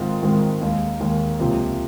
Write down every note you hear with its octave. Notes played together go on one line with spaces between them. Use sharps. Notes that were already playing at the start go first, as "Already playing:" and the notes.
Already playing: G#2 D#3 G#3 C4 F4
G#2 D#3 G#3 C4 F4
D#2 D#3 G#3 D#4
D#2 D#3 G#3 D#4
C#2 C3 F3 A#3